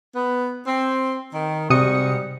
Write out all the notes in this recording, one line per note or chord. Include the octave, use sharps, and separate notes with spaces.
B3
C4
D#3
G#2 C3 G3 F#4 D#6 C#7